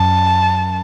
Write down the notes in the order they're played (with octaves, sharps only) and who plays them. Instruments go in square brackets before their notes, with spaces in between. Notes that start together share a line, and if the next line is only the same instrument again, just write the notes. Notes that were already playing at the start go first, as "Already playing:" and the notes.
Already playing: [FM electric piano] F#2 [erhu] A5